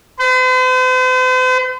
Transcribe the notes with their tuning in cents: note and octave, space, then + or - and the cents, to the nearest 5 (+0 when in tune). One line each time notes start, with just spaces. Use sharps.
C5 -45